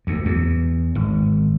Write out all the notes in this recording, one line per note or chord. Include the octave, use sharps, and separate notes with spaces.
D2
E2
G#1